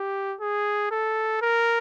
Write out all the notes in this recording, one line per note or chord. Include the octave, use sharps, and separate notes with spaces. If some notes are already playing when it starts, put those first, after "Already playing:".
Already playing: G4
G#4
A4
A#4